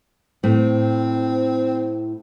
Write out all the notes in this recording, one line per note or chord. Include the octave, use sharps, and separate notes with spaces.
A2 C4